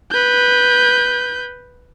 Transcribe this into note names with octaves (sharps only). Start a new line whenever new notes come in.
B4 G6